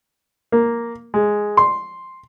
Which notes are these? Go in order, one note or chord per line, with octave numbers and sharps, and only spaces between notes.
A#3
G#3
C6